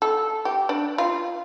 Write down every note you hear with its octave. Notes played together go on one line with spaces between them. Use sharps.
A4
G4
D4
F4